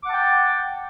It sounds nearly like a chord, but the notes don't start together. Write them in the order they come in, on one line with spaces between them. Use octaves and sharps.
D6 F#5 A5 G5